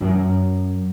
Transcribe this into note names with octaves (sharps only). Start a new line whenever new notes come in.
F#2